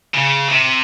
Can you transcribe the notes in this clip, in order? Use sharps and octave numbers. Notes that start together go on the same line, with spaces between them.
C#3
C3